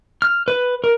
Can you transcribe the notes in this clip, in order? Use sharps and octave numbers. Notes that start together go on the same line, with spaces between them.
F6
B4
A#4